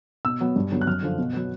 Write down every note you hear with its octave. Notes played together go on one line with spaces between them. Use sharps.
B2 E6
F#3 B3
G2
D3 F#3 B3
F#6
F#2 F6
D3 F3
B2
F#3 B3